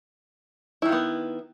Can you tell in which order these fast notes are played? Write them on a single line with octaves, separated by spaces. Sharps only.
E4 D#3 F4 B3